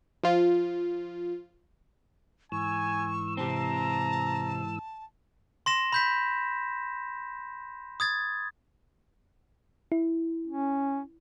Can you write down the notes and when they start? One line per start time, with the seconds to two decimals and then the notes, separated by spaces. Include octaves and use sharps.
0.23 F3 F4
2.52 G#2 E3 G#5 C#6 E6
3.37 C3 C4 A5 A#5
5.66 C6 A#6 E7
5.92 B5 G6 B6
8.00 D#6 G#6 A6
9.92 E4
10.48 C#4